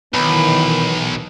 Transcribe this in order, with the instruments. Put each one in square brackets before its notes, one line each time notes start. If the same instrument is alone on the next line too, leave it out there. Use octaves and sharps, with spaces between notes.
[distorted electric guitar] B1 [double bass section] D#3 E3 [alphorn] B3 [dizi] B5